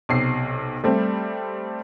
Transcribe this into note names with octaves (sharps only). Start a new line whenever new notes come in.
B1 C3 C7
G3 A3 C4